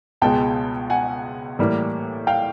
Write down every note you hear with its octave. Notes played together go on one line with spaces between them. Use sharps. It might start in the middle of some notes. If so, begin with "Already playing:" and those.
C#2 B2 G#3 G5 A5
F#5 G#5
A2 E3 G3 A#3
F5 G5